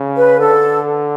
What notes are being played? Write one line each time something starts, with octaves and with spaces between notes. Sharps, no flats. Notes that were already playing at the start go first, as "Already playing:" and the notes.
Already playing: C#3
B4
D3 A4